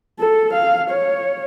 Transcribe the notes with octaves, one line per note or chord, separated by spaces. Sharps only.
A4
F5
C#5